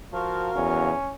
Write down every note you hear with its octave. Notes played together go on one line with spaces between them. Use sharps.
F3 F#4 A#4 F5
E2 C#4